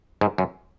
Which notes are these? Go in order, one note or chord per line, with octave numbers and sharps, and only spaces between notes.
G#2
F#2